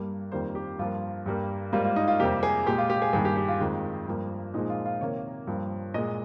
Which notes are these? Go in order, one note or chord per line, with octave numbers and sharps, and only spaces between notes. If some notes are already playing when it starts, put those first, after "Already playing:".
Already playing: G2 G3 A#3
F2 D#3 G3 A#3 C5
G4
G2 F3 A#3 F4
G2 G3 A#3
G#2 G3 A#3 F4
F4
D#4
F4
F2 C3 G3 A#3 G4
G#4
A#2 G#3 G4
F4
G4
G#4
G2 D#3 A#3 G#4
G4
G4
F4
F2 D#3 G#3
G2 F3 A#3
A#2 F3 G#3 D#4
F4
F4
C3 D#3 A#3 C#5
G2 F3 A#3
A#2 G#3 D#5